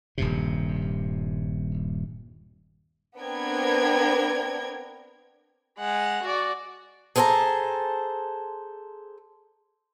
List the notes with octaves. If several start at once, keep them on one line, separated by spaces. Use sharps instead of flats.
D#1 G2 C3
B3 C4 D4 A#4 G5 G#6
G#3 F#5
F#4 D5
G#4 A4 C5 F5 A5 A#5